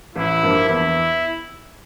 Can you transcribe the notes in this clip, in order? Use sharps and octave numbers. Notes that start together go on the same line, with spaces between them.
A1 E4
G2 F3 A#3
E2 E4